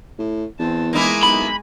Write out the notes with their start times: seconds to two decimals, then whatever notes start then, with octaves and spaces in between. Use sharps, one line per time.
0.19 A2
0.59 E2 C4 A5
0.93 G#3 A#3 D#4 E4 G#5
1.23 B1 B5